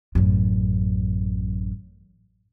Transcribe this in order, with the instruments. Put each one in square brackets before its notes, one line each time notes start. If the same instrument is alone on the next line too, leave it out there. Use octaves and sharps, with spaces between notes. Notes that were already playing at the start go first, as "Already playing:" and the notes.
[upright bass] A1 F#2